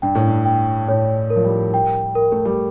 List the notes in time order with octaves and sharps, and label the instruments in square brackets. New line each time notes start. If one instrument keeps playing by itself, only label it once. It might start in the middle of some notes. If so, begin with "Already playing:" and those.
[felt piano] G2 [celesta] G5
[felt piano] A2
G2
[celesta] G5
[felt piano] A2 [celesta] C#5
[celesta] A#4
[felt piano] F3
G3
[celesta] G5
A#4
[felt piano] A3
G3